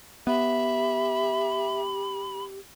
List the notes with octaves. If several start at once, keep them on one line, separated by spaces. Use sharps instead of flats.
B3 G4 E5 B5